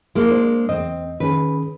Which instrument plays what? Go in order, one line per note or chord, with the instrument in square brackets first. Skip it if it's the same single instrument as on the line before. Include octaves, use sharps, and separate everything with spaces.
[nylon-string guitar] G#3 A#3 [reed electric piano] E4
[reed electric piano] D4 C5
[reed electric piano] E2 D#5 [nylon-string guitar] C4
[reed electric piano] D#3 C#4 G#4 [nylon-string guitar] B4